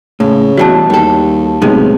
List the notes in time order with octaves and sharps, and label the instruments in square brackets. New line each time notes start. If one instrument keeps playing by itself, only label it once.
[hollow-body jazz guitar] A2 [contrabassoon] C#3
[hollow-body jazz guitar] B2 E3 G3 [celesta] F#4 A5
[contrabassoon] D#2 [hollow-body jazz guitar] G3 A4
[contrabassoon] B1 [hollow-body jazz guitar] A2 C3 G#3